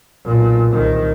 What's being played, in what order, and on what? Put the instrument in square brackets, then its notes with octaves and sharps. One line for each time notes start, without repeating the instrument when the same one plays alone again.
[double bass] B1 A#2
C2 D#3